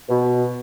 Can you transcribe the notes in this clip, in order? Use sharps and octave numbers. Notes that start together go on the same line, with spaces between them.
B2